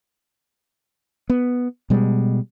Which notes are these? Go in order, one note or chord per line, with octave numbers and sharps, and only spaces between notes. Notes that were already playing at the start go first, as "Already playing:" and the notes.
B3
B2 G3 G#3